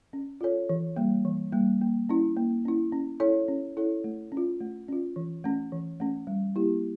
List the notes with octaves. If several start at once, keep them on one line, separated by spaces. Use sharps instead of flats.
C#4
F4 A4 C#5
E3
G3 A#3
E3
G3 A#3
A#3
C#4 E4
A#3
C#4 E4
C#4
E4 A4 C#5
C#4
E4 A4 C#5
A3
C#4
F4
A3
C#4 F4
E3
A3 C#4
E3
A3 C#4
G3
A#3 E4 G4